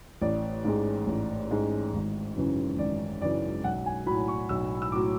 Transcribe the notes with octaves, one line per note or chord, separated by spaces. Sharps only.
A1 D5
G#2 G#3
A1
G#2 G#3
G#1
F#2 C#3 E3
G#1 D5
F#2 C#3 E3 D5
B1 F#5
G#5
A2 F#3 B5
C#6
B1 E6
E6
A2 F#3 D6